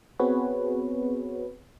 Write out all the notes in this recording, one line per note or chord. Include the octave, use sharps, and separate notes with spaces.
B3 C4 F#4 G#4 B4 C#5